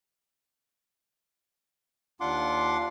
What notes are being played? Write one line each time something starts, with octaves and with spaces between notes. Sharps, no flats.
D#2 D4 F4 F#5 C6 D6